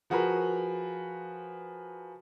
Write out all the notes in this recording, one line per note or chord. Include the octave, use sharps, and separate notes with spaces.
F3 F#4 G#4 A#4 B4